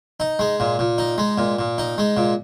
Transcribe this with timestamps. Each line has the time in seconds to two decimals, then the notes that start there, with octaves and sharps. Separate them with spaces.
0.20 D#4
0.39 G#3
0.60 A#2
0.79 A#2
0.98 D#4
1.18 G#3
1.38 A#2
1.59 A#2
1.78 D#4
1.98 G#3
2.17 A#2